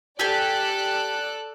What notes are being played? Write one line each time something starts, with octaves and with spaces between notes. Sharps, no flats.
G4 A4 D5 G#5 F#6